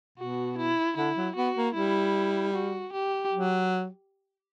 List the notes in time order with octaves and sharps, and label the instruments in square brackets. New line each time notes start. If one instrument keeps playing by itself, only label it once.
[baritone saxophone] B2 [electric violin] F#4
[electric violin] E4
[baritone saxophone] D3 [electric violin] E4
[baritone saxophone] F#3
[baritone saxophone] B3 [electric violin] F#4
[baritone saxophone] A#3
[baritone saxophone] G3 [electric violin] E4
[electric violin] F#4
G4
[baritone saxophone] F#3